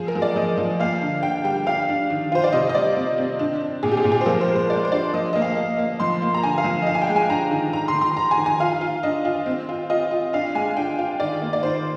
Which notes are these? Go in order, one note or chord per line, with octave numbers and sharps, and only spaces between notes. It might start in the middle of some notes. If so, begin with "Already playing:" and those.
Already playing: F3 G#4
A#4
F3
D5
F3 D#5
F3
A#3 F5
D3
D3 G5
G3 G5
D4 F5
D4
D#3
F4 C5
D5
C3 D#5
D#5
G3 D5
C4
C4
D4
D4
A#2 G#4
G4
G#4
A#2
G#4
C5
F3 A#4
C5
G#3
C5
G#3 D5
C5
D4 D5
F3 D#5
A#3 D#5
F5
A#3
A#3
F3 C6
A#3
A#5
D3 G#5
F5
F3
D#5
D4 F5
G#5
G5
G#3
G#5
D4 A#5
D#3
D#3 A#5
C6
D#3
C6
D#3 A#5
G#5
D#3
G#5
F4 F5
F4
D4 D#5
F4
C4
F4
F4 D#5
F4
D4 F5
G#3 G#5
D4 G5
F4
D#3 D5
A#3
D5
D#3 C5